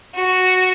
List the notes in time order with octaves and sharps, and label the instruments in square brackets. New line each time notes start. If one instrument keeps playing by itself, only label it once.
[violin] F#4